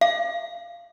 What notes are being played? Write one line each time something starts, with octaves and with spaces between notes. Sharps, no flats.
F5